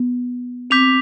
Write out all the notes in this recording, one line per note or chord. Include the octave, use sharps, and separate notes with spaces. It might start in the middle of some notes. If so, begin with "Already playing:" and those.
Already playing: B3
C4 D6 G6 B6 F7